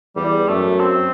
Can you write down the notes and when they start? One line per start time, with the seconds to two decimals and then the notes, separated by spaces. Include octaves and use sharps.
0.16 E2 G3
0.48 F#2 A3
0.80 C4